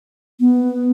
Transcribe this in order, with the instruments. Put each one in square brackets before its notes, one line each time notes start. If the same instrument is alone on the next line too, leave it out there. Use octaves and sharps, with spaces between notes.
[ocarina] B3